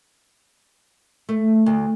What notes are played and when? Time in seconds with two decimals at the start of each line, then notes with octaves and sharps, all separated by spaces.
1.29 A3
1.66 D2